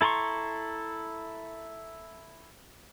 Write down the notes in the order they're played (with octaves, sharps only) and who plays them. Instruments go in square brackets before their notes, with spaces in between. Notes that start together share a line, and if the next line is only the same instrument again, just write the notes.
[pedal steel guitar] E4 A4 A#5 C6 C#6